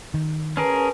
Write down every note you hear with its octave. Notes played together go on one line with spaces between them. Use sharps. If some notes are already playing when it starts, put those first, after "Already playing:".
D#3
C#4 G#4 A#4 B4 G#5 A5